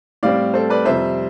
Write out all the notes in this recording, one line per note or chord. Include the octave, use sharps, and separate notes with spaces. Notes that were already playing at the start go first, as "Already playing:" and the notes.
A2 G3 C4 D5 F5
A4 C5
B4 D5
F2 C3 G3 C5 E5